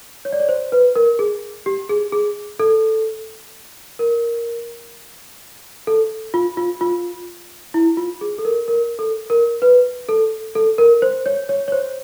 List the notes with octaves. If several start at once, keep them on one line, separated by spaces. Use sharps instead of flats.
C#5
D5
C#5
C5
B4
A#4
G#4
G4
G#4
G#4
A4
A#4
A4
F4
F4
F4
E4
F4
G#4
A4
A#4
A#4
A4
A#4
B4
A4
A4
A#4
C5
C#5
C#5
C#5
C5